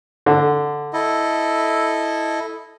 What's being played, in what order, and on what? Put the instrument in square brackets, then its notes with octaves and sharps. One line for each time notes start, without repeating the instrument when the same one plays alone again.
[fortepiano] D3
[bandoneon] E4 A4 D#5